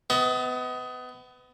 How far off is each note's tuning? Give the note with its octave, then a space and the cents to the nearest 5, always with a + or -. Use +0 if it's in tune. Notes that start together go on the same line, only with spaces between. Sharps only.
B3 +25 D#5 +45